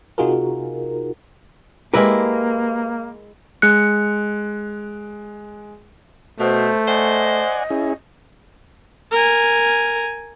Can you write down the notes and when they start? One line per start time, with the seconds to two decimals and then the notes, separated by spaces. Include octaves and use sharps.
0.18 C3 D#4 F4 F#4 G#4 A#4
1.94 G#3 A#3 E4 G4 A#4 B4
3.62 G#3 F#6 C#7
6.40 B2 A3 C5
6.88 C5 D5 D#5 F#5 G#5
7.70 C#4 E4 G#4
9.12 A#4 G#5